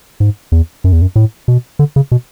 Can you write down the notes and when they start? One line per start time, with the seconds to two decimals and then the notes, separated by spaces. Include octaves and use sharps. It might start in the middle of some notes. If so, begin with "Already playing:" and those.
0.20 G#2
0.52 E2
0.84 F#2
0.92 E2
1.02 F#2
1.16 A2
1.48 B2
1.79 D3
1.96 C#3
2.12 B2